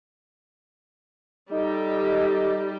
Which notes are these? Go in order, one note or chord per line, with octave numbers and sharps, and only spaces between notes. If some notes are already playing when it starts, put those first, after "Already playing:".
G3 D#4 G4 A4 D#5